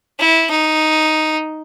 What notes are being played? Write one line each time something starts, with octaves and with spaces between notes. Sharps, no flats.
E4
D#4